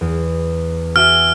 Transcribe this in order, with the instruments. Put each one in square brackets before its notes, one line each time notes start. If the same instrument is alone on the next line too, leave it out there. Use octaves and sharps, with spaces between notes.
[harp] E2
[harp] F#4 E5 G#5 [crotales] F6